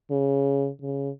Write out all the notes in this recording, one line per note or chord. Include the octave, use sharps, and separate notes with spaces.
C#3
C#3